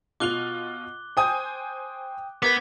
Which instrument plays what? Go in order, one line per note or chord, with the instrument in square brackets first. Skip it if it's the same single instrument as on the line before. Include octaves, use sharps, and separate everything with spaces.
[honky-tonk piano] B2 F4 F7 [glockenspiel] D6 F#6 G7
[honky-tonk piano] C5 G#5 G6 [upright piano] G5 D#6
[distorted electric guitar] B3 [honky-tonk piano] A#4 B4 [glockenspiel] D6 G#6 B6